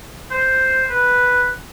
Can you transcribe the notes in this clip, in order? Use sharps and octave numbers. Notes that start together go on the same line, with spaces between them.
C5
B4